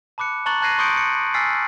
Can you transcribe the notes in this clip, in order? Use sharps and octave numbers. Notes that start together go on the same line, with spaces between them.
A5 B5 D6 F#6 C#7
A5 A#5 C#6 F#6 A6 F#7
A5 F#6 G#6 A#6 C7 D#7
C6 C#6 D#6 G6 C#7 D7
C#7
G#5 E6 F6 A6 B6 C7